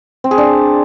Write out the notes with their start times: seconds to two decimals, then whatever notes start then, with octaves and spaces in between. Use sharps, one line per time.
0.24 C4
0.31 G#4
0.38 D4